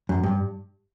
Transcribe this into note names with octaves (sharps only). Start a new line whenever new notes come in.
F#2
G2